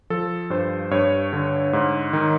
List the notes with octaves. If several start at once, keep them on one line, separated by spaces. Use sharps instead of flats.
F3 A4
G2 C5
G2 C#5
D3
G#2
D#3